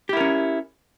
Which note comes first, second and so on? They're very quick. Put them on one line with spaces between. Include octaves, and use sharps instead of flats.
G4 E4 A#4 C#4